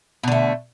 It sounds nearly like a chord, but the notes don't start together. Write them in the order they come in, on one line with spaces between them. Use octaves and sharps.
B2 D3 A3